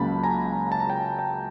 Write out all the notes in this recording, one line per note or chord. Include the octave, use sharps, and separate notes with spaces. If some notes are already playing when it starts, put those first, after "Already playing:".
Already playing: C#2 C#3 F#3 A#3 C#4 A5 B5
G#5 A#5
A5
A#5
G5 A5
G5 A5